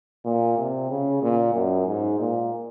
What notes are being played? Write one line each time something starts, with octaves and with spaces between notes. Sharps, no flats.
A#2
C3
C#3
A#2
F#2
G#2
A#2